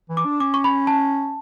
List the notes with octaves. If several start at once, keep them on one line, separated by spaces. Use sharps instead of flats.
E3
D6
D4
C#4 D6
C#6
B5
A5